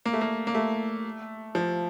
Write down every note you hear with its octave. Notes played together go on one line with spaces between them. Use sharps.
A#3
A3
A#3
A#3
A3
F3